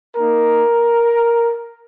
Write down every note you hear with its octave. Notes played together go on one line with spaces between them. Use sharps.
A#3 D#4 A#4